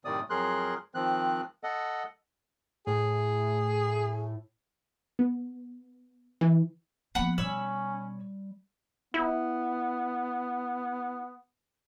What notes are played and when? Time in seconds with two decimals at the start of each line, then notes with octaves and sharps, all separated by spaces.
0.05 F#2 A2 C3 D#3 D5 D#6
0.30 F2 F#3 G#4 A#4 C6 F#6
0.95 D#3 F3 C4 F#6
1.63 A4 D#5 F#5
2.87 A2 G#4
5.19 B3
6.41 E3
7.15 F3 A#3 B3 F#5 B5
7.38 B2 G3 C#4 C#5 B5 E6
9.14 B3 E4